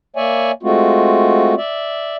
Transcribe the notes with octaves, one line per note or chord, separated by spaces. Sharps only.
A#3 C#5 D5 E5 G#5
G#3 A3 C4 F4 F#4
D5 E5